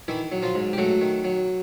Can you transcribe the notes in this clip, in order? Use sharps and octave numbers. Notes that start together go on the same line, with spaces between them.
D#3 E3 E4
F#3
F3 F4
G#2
G4
F#3 A3 F#4
D#3
F#3